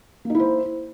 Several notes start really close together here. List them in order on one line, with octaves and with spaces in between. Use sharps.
A#3 D#4 E4 C5